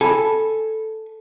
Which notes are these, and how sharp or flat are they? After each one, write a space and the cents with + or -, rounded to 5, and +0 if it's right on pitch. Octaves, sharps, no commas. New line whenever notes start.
A4 +0 G#5 +0 B5 -10